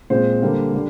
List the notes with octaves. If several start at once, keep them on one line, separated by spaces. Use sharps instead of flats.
A#2 G#3 C4 C5
D3 G3 A#3
D3 G3